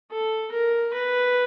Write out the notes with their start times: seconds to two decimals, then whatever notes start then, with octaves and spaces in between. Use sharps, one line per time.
0.11 A4
0.51 A#4
0.93 B4